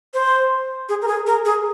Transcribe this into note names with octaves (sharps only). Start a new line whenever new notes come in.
C5
G#4
A#4
G#4
A#4
G#4